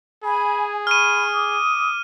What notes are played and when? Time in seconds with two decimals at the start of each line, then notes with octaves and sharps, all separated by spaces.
0.24 G#4 G#5 B5
0.87 B5 C#6 F6 D#7
1.32 D6 D#6